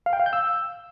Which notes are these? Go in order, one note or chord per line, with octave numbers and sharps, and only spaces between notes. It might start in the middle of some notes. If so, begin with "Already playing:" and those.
F5
G5
F5
G6
E6